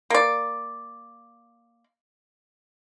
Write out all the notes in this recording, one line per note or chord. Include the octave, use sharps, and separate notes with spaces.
A#3 D5